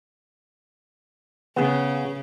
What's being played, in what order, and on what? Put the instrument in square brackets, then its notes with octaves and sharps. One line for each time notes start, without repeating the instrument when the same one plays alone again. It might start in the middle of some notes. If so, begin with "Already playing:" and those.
[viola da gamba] C#3 [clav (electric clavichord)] B3 G#4